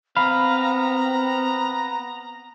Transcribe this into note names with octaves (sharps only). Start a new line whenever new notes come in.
B3 C4 F5 A#5 B5